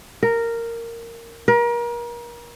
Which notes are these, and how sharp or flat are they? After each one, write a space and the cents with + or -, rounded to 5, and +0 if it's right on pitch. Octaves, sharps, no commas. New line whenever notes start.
A#4 -10
A#4 +35